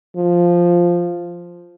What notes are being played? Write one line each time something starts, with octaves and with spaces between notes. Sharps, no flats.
F3